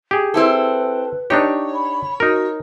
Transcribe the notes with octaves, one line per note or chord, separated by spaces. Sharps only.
G4 G#4
C4 E4 A4 B4
D4 D#4 G4 C#5
B5
D#4 F#4 A#4